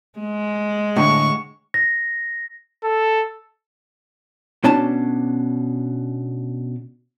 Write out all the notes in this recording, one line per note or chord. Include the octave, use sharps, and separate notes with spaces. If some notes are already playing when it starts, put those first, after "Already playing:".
G#3
A2 D3 C#6
A#6
A4
B2 C#4 D4 A5